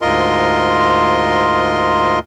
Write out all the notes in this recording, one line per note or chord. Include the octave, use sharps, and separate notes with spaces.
D2 G#2 F4 A#4 D#5 C6